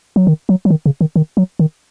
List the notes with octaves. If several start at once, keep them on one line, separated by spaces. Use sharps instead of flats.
F#3
D#3
F#3
F#3
D#3
C#3
D#3
D#3
F#3
D#3